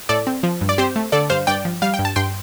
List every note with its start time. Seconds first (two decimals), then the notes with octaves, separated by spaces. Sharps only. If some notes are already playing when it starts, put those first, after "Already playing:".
0.09 A2 A4 D5
0.27 C4
0.43 F3
0.61 G2
0.69 D5
0.78 C4 G4 C5
0.96 A3
1.12 D3 A4 D5
1.30 G2 C5 F5
1.47 G2 D5 G5
1.65 F3
1.82 G3 F5
1.94 G5
1.99 G2
2.05 A5
2.16 G2 G5 C6